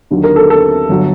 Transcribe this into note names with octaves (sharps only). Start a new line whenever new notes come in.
D#2 D3 F#3
A#4
A4
A4
G1 F#3